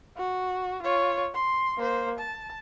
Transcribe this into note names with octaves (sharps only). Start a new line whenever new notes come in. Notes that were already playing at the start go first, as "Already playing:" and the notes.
F#4
F4 C#5
C6
A#3 C5
A5